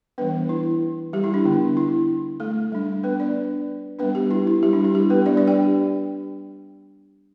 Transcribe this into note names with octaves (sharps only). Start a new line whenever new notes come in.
E3 G3 B3 D4 B4
E4
G3 G4
E4
D4
D3 B3 D4
E4
A3 A4
G3 D4
B3 B4
D4 D5
G3 B3 D4 B4
G3 G4
E4
E4
G3 G4
D4
E4
G3 G4
B3 B4
G3 D4 D5
D4 D5
G4 G5